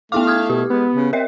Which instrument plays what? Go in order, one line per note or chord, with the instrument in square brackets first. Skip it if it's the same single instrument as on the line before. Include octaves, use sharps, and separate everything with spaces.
[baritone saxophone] A3 [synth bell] B3 E4 D6 [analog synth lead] F5
[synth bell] D#6 F6 G#6
[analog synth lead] B2 [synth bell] G4
[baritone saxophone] G#3 [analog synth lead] B3
[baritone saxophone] C#3
[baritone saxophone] C4 [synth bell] A#4 D#5 E5